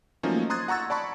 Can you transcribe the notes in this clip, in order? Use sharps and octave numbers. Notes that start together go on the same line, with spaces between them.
F3 F#3 A3 A#3 C#4 D#4
A#5 C6 D#6 F#6 G#6 A6
F#5 A#5 C#6 E6 A6
D5 A5 B5 C#6